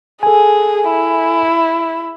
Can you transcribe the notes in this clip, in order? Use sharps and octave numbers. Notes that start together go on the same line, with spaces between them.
G#4 A4 G#5
E4